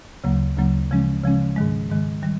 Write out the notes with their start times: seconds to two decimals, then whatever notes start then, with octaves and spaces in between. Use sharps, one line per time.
0.24 D2 C#3 F#3 A#3
0.57 D2 C#3 F#3 A#3
0.91 C#3 F3 G#3 C#4
1.24 C#3 F3 G#3 C#4
1.56 G#2 D#3 G#3
1.91 G#2 D#3 G#3
2.23 D#3 G3